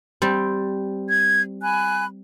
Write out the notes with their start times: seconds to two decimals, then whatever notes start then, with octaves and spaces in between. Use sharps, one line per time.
0.22 G3 C4
1.09 G#6
1.62 G#5 B5 F#6